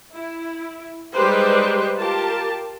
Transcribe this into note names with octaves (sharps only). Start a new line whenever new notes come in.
E4
G3 G#3 D#4 G4 B4 C5
F4 G4 A#4 A5